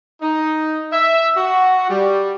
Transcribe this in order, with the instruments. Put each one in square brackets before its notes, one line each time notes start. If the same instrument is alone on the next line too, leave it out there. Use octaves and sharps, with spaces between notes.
[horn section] D#4
E5
F#4
G3